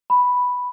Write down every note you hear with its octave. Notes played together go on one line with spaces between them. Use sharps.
B5